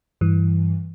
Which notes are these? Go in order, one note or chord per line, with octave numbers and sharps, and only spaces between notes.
G2 E3